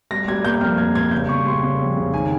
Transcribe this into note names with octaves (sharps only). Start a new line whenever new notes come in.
G3 A#6
G3 G#6
A#3 G6
F2 F6
A#3 G#6
G3 G#6
C#3 G6
C#3 C#6
G3 C6
C#3
F2
C#3
D#3 G#5